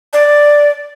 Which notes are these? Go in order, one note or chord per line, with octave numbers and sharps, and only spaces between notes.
D5